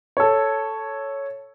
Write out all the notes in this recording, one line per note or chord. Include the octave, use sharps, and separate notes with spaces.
A4 C#5